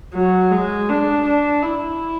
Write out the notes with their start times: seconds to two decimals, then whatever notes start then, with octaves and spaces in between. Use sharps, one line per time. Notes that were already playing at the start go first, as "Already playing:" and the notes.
0.14 F#3
0.51 G#3
0.89 D4
1.26 D4
1.63 E4